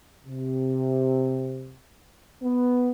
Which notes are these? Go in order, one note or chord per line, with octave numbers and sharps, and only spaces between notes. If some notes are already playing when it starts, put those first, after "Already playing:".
C3
B3